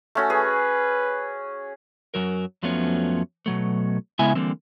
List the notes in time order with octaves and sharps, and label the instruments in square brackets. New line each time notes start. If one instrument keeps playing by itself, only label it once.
[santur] A3 C#4 F#4
[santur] G#4 [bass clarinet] B4
[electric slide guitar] F#2 C#3 F#3 A#4
F2 F3 F#3 A3 B3 C#4
B2 F#3 A3
C#3 G#3 B3 E4 E5 G#5
D3 E3 G3 A#3 C4